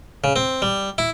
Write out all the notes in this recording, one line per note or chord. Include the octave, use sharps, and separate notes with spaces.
C#3
C4
G3
E4